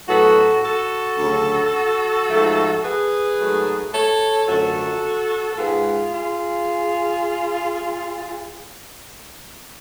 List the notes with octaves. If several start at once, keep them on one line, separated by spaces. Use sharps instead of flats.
A2 F#3 B3 F#4 A4
F#4 A4
D2 C#3 F#3
G#2 F3 A3
G#4 B4
G#2 F#3 A3
A4 C#5
F#2 D3 F3 A3 F#4 A4
A4
G#2 G#3 B3 F4 G#4
F4 G#4